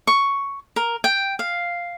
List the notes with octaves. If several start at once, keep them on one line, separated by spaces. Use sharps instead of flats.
C#6
A#4
G5
F5